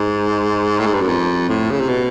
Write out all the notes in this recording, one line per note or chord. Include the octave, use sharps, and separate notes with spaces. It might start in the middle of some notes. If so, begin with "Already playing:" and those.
Already playing: G#2
A2
G#2
G2
F#2
F2
A2
C#3
C3
B2